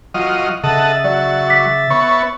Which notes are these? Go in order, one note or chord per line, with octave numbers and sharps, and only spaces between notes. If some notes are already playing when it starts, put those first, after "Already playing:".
F#3 F4 D#5
C#3 A4 D#5 E5 F#5 A6
F#3 D5
D6 B6
B3 C#5 C#6